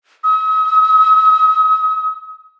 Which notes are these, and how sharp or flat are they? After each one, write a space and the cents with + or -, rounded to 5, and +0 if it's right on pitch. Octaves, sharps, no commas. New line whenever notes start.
D#6 +45